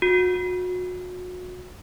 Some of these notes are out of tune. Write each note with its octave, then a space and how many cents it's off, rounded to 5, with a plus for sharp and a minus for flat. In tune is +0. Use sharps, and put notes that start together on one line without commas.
F#4 -30